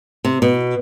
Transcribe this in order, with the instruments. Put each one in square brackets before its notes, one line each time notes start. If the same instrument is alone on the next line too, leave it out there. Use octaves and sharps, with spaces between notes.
[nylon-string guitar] C3
B2